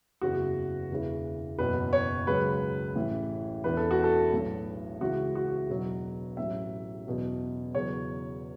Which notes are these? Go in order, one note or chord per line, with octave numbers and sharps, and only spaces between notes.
F#1 E2 C#3 E3 F#4
E1 E2 C#3 E3
F#1 E2 B2 F#3 B4
C#5
C#2 C#3 F#3 B4
A1 A2 E3
E1 E2 E3 B4
A4
F#4
A4
B1 A2 F#3
C#2 C#3 E3 F#4
F#4
E1 E2 B2 F#3
A1 A2 F#3 E5
E2 B2 F#3
E2 C#3 F#3 C#5